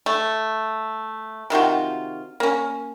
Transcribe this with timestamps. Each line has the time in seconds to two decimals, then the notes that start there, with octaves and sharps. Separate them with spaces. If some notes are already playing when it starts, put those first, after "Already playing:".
0.06 A3
1.50 C3 D#3 F4 F#4
2.40 A#3 C#4